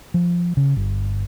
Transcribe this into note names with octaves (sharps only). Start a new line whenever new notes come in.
F3
C#3
G1